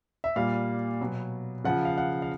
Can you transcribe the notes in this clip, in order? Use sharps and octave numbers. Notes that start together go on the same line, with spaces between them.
E5
A#2 G3 F5
B2 F#3
C#3 F3 F#5
F5
F#5
F5